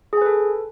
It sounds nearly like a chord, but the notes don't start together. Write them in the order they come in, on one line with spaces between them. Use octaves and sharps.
G#4 G#5 B4 A4